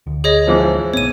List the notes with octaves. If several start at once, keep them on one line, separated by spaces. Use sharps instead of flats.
D2
G#4 C#5 D#5
G#2 E3 F3
B1 G2 B3 C#5 D#7